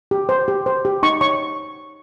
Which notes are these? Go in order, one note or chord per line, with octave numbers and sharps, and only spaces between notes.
G4
C5
G4
C5
G4
D#4 C#6
C#5 C#6